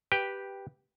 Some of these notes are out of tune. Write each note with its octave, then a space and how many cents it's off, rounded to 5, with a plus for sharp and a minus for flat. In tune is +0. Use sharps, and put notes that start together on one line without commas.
G4 +0 B4 -5 G5 +5